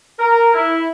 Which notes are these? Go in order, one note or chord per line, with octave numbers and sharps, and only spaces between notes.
A#4
E4